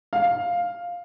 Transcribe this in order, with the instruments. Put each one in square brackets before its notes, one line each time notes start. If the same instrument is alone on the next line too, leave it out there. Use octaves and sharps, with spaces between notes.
[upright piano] F5